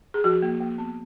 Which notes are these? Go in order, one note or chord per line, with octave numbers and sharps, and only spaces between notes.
G#4
F3 F#4
A#3
A#3
B3